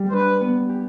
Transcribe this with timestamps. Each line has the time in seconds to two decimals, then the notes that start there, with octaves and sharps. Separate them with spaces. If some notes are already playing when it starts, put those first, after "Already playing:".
Already playing: G3 G4
0.09 C5
0.12 D4 B4
0.41 B3
0.69 G4